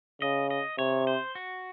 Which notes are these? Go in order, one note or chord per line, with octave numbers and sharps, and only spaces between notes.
C#3 D#5
D#5
C3 C#5
C5
F#4